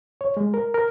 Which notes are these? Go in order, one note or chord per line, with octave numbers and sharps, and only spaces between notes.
C#5
G#3
A#4
A#4